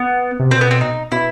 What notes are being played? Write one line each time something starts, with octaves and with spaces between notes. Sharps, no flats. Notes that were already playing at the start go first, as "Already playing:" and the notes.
Already playing: B3
C3
B2 C4
B3
C4
D#4
B2 E4